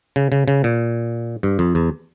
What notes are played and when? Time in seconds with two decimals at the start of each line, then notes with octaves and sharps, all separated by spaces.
0.16 C#3
0.32 C#3
0.48 C#3
0.64 A#2
1.43 G2
1.59 F2
1.75 E2